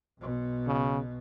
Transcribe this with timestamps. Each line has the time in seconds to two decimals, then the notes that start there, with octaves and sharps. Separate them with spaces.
0.19 B1 B2
0.67 C#3